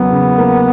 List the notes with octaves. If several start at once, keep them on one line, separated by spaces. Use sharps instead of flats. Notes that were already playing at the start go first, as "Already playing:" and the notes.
Already playing: E2 C#3 F#3 A#3 B3
C#3
A#3